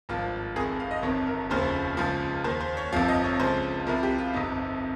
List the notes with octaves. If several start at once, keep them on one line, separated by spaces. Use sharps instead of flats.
G#1 G2 F3 F4
F1 F2 D#3 G#4
F5
D#5
G1 F2 C3 D#3 C#5
A#4
F1 D#2 C#3 F3 C5
C#2 C#3 F3
D#2 D#3 C5
C5
C#5
G1 F2 C3 F3 F5
D#5
C#5
C#2 C#3 F3 C5
C2 C3 F3 A#4
G4
F4
G1 F2 C3 D#4